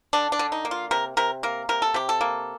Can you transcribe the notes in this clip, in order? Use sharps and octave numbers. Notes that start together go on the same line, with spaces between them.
D3 D4
D4
D3
D#4
A#3
F4
C3 A#4
C3 A#4
A#3 A#4
C3 A#4
A4
C3 G4
A4
A#3